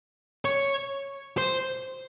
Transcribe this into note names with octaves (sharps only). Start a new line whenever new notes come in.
C#5
C5